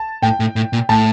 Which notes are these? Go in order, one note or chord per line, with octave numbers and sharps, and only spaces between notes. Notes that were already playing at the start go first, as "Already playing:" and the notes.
Already playing: A5
A2 G5
A2
A2
A#2
A2 A5